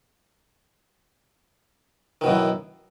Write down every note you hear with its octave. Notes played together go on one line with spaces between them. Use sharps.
F#2 B2 D#3 E3